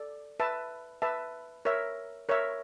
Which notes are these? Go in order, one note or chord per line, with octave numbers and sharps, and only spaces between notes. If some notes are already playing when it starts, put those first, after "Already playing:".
Already playing: A4 D5
B4 E5 A5
B4 E5 A5
A#4 C#5 E5
A#4 C#5 E5